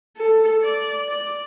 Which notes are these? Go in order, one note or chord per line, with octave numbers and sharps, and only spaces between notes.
A4
D5
D5